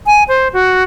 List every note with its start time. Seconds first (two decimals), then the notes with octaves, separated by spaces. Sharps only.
0.06 G#5
0.28 C5
0.53 F#4